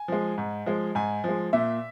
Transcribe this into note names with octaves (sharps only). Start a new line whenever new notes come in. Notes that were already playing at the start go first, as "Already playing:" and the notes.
Already playing: G#5
F3 G#3
G#2
F3 G#3
G#2 G#5
F3 G#3
A#2 E5